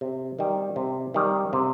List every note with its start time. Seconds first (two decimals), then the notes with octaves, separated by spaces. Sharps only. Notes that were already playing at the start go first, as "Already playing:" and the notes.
0.01 C3
0.39 D#3 G3
0.76 C3
1.14 D#3 G3
1.53 C3